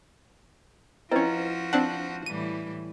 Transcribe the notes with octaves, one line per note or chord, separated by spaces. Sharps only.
F3 C4 C#4 E4 F#4 B4 D#5
C4 D4 F#5 A5
A2 E3 G3 D#7